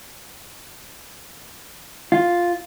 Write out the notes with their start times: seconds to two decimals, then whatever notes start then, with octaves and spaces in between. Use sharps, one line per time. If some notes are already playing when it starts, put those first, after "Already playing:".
2.12 F4